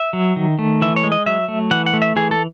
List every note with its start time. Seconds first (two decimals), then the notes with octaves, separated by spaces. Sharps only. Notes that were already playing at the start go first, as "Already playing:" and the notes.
Already playing: E5
0.13 F#3
0.36 D#3
0.59 A3
0.82 E3 E5
0.96 C#5
1.03 G#3
1.12 D#5
1.26 F#3 E5
1.48 A3
1.71 E3 F#5
1.86 F#5
1.93 A3
2.02 E5
2.16 E3 G#4
2.31 A4